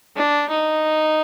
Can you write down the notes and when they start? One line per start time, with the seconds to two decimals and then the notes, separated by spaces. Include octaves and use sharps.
0.16 D4
0.49 D#4